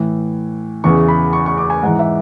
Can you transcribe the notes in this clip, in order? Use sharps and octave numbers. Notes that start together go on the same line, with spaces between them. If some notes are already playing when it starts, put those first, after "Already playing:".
Already playing: A2 E3
E2 C#3 E3 C#6
B5
C#6
C#6
D6
G#5
G#2 E3 F#5
E5